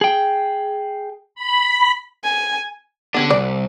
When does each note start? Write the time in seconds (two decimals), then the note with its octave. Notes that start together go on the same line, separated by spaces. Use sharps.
0.01 G#4 G5
1.35 B5
2.24 G#5
3.14 D3 B3 C#4 D4 G4
3.30 C2 D5